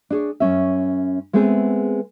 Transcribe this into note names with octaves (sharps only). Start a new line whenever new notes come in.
D4 G#4 C#5
F#2 C#4 E5
G#3 A3 B3 C4 G#4